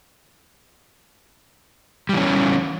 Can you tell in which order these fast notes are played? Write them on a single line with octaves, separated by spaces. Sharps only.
G3 E3 C#4